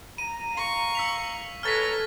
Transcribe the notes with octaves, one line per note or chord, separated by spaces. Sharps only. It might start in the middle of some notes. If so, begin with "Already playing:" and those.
A#5 D#7
F5 C#6
E6 B6 F7
A4 B4 C#5 G#5 A#5 F6 A6 B6